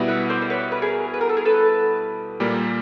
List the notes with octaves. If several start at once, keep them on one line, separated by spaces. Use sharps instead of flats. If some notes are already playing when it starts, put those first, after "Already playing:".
Already playing: B2 G3 B3 E4
E5 F#5
C5 D5
C5
B4 C#5
B4
G#4 A#4
B4
A#4
A4
G#4 A#4
A4 B4
A#2 G3 A#3